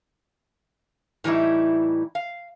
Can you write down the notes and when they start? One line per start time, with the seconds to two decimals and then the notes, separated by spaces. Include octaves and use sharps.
1.24 A2 E3 G3 D#4 E4
2.15 F5